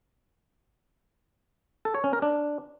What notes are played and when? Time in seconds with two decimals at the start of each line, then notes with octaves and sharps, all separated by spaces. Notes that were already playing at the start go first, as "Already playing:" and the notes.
1.85 A4
1.95 C#5
2.04 C#4
2.13 A#4
2.22 D4